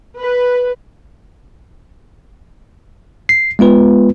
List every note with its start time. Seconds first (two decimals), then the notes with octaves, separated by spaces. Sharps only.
0.18 B4
3.29 C7
3.59 G#3 B3 F4 B4